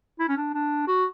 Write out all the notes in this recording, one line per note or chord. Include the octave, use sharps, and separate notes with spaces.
E4
C#4
D4
D4
F#4